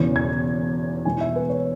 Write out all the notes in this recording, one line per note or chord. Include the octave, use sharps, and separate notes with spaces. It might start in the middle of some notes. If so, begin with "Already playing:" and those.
Already playing: E1 E2 C#3 E3
G#6
E1 E2 E3 G#3 G#5
E5
B4
C#5